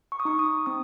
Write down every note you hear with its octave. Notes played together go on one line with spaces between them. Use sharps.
C#6
D#6
D#4 C#6
D#6
C4 D#6